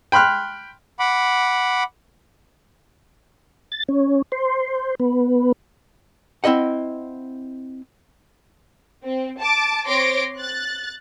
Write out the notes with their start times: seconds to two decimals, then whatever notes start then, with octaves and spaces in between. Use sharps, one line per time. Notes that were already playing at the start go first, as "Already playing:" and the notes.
0.12 G5 B5 C6 F6 F#6
0.99 F#5 B5 D6
3.72 A6
3.88 C#4
4.32 C5
5.00 B3
6.44 C4 E4 D#5 F#5
9.05 C4
9.39 A5 D6
9.87 C4 C#5 C6 D6 A#6 D7
10.39 F#6 A6